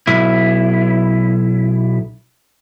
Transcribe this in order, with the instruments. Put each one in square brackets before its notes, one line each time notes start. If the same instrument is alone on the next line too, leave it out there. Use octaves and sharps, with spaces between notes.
[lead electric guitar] B1 E4